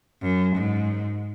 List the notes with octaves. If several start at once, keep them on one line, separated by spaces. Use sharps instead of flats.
F#2
G#2